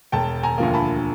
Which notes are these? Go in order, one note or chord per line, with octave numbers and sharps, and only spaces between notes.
E1 G5 A5
G#5 A#5
D2 D3 F3 A#3
A5 B5